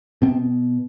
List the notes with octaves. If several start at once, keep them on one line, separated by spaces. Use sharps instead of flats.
B2 C4